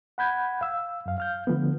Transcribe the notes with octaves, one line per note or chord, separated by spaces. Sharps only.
F#5 B5 G6 G#6
F5 E6
F#2 F5
F5 F6 G6
D3 F3 A3 B3